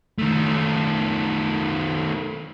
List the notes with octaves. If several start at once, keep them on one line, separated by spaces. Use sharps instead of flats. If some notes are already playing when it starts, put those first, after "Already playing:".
D#3 A3